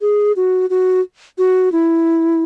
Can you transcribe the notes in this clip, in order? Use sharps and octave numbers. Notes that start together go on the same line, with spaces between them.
G#4
F#4
F#4
F#4
E4